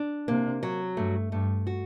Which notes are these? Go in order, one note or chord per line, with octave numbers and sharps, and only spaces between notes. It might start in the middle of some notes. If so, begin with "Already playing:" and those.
Already playing: D4
C3 A#3
F#3
G2 A3
G2 A3
F#4